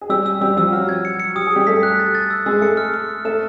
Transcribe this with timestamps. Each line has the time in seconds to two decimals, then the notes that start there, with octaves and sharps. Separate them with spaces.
0.01 G#4
0.09 G3 G4 E6
0.26 E6
0.41 G3 G4 E6
0.57 F3 F4 E6
0.72 F#3 F#4 F6
0.89 G#6
1.05 C#7
1.20 C#7
1.35 G4 D#6
1.46 G#4
1.52 G3 G4 D#6
1.67 A3 A4 B6
1.83 F#6
1.99 A6
2.15 A6
2.30 E6
2.46 G#3 G#4 E6
2.61 A3 A4 C#7
2.77 F6
2.94 F6
3.09 C#7
3.25 A3 A4 E7